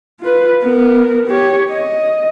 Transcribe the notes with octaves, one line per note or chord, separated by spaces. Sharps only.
F4 B4
B3 A#4
G4 C#5
D#5